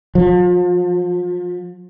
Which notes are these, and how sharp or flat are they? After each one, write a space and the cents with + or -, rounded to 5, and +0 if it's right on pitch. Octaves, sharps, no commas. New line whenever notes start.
F3 +35